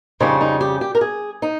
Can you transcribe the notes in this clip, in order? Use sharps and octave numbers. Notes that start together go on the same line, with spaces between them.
F2 C#3 G3 C#4 D#4
D#4
G4
G4
A#4
G#4
D#4